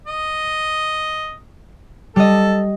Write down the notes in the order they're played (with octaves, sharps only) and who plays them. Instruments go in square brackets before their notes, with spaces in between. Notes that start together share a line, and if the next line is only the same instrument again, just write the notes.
[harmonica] D#5
[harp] G3 D#5 [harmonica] A4